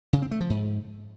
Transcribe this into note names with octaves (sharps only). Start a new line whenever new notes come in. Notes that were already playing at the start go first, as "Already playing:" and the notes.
C#3
C4
A3
F3
G#2